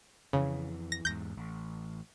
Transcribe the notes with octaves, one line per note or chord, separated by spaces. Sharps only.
F2 C#3 E3
A#6
E2 G#2 G6 A#6
A1